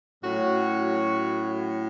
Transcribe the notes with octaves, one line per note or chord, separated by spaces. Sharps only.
A2 F#3 C#4 F#4